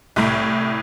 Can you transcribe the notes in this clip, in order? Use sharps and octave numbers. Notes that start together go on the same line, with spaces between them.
C2 A2